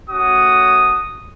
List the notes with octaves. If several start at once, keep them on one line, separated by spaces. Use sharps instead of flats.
A3 C#4 F#4 D#6